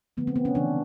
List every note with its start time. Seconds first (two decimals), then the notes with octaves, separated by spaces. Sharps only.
0.17 D3 F3 A3 B3
0.27 C4
0.36 B3
0.45 C#4
0.55 C#3 E3 A3 D4